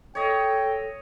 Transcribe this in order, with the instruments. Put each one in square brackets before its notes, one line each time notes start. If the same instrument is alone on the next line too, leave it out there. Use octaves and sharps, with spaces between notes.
[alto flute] A4 [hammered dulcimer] C#5 D#5 [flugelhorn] G5